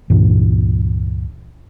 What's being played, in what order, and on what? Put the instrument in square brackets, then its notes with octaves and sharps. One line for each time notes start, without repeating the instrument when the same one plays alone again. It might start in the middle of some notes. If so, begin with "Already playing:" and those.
[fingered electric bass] C#2 G2 A#2 E3